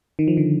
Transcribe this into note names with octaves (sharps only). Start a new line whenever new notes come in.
D#3
F3
D3